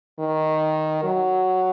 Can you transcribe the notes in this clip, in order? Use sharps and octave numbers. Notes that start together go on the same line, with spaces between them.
D#3
F#3